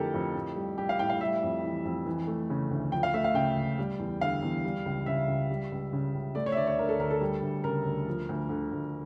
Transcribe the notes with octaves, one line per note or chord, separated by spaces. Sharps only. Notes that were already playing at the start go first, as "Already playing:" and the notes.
Already playing: F2 D3 A3 E4 G4 A4 A#4
F2
A2
G3
G3 G4
F5
A2 G5
F5
G3 E5
F2
E3
F2
E3
A3
C#3
D2
F3 G5
F5
A3 E5
F5
C#3 G5
C#2
G3
E2
D3 F5
E2
G3
C#2
C#3 E5
C#2
G3
C#2
C#3
C#2
A3 D5
C#5
E5
D2 D5
C#5
D3 A#4
A4
D2 A#4
A4
G3
D2
C#3 A#4
D2
F3
D2
D3
D2